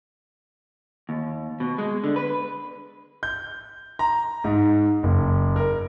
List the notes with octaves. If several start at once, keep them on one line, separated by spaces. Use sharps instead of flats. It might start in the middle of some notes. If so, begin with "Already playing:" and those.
D#2
B2
G#3
D3
B4
G6
A#5
G#2
F#1
A#4